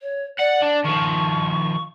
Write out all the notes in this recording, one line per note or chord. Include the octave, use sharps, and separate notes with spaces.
C#5
D5 F#5
D4
D#3 F3 C#6